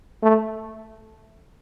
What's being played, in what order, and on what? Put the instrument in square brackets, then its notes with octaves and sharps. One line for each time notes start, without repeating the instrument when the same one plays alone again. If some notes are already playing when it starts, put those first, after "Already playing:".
[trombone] A3